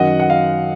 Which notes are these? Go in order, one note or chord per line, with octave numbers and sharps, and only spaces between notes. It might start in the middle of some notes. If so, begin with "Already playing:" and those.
Already playing: F#2 D#3 F#3 D#5 F#5
F#5
F5